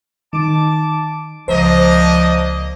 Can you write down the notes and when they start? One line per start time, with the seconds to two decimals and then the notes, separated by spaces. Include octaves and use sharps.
0.33 D#3 A5 D6
1.48 C#2 F3 A#3 D4 C5 D#5 A#5